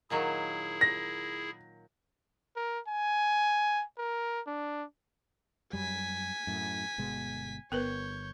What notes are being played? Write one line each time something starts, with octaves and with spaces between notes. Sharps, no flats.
A#2 D#3 F#3 E4 G#4
A#6
A#4
G#5
A#4
D4
F#2 G3 G#5 B6
F#2 A2
G1 B2 G#3
G1 B3 A#4 B4 C#5 G6